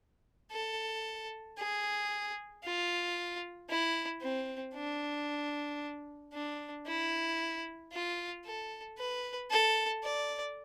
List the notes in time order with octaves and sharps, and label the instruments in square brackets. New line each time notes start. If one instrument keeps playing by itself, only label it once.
[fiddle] A4
G#4
F4
E4
C4
D4
D4
E4
F4
A4
B4
A4
D5